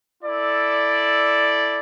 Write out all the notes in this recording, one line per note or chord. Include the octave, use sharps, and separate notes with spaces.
E4 A4 D5